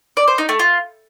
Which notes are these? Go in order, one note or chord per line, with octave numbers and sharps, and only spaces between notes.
D5
C5
D#4
A3
F4